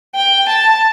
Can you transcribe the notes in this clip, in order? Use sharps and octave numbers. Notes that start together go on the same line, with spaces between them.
G5
A5